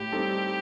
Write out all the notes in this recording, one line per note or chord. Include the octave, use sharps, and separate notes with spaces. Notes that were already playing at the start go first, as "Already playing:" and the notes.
Already playing: A2 G4
G3 C4 D#4 A4